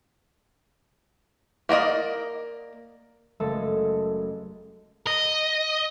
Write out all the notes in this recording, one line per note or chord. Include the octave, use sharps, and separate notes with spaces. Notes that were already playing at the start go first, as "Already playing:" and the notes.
A#3 A#4 D5 D#5
F#1 G#3 A3 A4
D#5